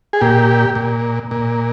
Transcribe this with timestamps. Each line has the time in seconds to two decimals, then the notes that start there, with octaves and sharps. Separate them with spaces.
0.13 G#4
0.21 A#2 G4
0.75 A#2
1.31 A#2